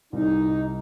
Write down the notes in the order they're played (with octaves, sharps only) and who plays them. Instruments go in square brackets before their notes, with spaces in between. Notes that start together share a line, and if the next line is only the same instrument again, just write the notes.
[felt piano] C2 [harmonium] D#4